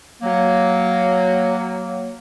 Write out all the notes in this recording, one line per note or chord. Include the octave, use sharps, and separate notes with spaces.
F#3 A#3